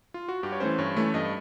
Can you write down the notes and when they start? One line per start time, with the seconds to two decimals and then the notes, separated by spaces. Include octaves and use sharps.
0.14 F4
0.29 F#4
0.43 G2 G4
0.52 C#5
0.60 E3 A3 C#4 C5
0.78 G2 C#5
0.97 E3 A3 C#4
1.14 G2 D#5